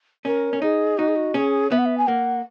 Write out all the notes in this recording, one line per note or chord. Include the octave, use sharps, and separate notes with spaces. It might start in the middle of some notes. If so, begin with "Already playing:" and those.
C#4 A#4
C#4
D#4 G#4
D#4 F#4
G#4
F#4
C#4 G#4
B3 E5
F#5
E5
G#5
A#3 F#5